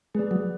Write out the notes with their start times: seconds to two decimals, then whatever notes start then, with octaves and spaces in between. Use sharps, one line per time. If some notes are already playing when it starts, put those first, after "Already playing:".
0.15 G#3 G#4 B4 D5
0.31 F#3